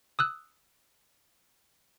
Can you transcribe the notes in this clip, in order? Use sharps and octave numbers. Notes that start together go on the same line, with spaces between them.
D#6 E6 F#6